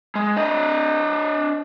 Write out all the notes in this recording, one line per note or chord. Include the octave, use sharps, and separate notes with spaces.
G#3
D4 D#5